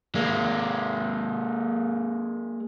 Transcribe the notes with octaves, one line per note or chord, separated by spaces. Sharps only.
G#3 A#3